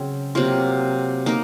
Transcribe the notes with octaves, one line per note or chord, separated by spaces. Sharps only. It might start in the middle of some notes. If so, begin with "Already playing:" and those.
Already playing: C#3 F#3 C4
C3 F#3 A#3 F4
A#3 D#4 A#4